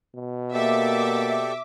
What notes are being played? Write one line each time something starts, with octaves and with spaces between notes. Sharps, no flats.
B2
A#3 G4 A4 D5 E5 D6